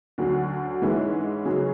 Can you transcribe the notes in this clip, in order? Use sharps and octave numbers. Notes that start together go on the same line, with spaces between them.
D2 D3 F#3
G#2 E3 G#3 C#4 E4
C#3 F#3 C#4 G#4